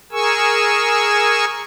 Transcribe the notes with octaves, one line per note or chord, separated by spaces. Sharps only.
G#4 A#4 G#5 C#6 E6